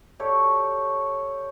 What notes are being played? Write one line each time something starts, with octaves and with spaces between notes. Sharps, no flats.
G4 A4 C#5 D5